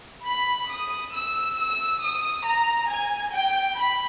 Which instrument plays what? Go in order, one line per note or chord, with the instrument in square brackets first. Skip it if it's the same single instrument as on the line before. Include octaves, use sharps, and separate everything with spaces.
[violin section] B5
D#6
E6
E6
D#6
A#5
G#5
G5
B5